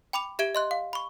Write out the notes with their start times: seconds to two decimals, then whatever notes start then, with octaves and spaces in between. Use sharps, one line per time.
0.13 G5 B5 D6 F7
0.39 G4 E5 G#6 D7 G7
0.55 D#5 C6 F#6
0.71 F5
0.93 B5 C#6